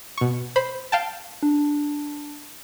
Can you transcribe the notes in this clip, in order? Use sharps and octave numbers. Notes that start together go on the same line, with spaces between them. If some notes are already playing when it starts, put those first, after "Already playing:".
B2 C#6
C5 B5
F5 G5 A5
D4